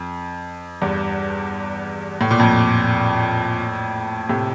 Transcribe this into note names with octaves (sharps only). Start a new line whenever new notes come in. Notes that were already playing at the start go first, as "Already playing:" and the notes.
Already playing: F2
E2 G2
A2
A#2
F2 A2
A2 C3